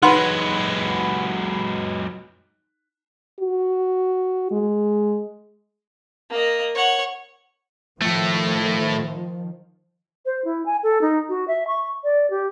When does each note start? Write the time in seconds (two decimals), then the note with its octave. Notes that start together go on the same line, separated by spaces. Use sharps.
0.03 F#3 G#3 D#4 B4 F#5 C6
3.40 F#4
4.51 G#3
6.30 A#3 D#5
6.75 C#5 F#5
8.02 A2 D#3 F3 A3
10.26 C5
10.45 E4
10.66 G#5
10.83 A4
11.01 D#4
11.29 F#4
11.48 E5
11.67 C#6
12.04 D5
12.30 G4